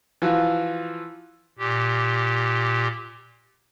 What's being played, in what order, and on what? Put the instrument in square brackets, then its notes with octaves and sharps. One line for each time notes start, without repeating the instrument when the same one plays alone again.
[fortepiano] E3 F3 F4 F#4
[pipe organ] A#2 G4